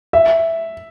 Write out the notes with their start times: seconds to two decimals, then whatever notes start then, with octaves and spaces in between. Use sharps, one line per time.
0.13 E5